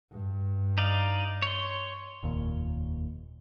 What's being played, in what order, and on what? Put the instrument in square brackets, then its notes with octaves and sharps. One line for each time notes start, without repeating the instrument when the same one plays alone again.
[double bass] G2
[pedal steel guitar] D#4 D5 F5
C#5 C6
[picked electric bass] F1 D#2 A#2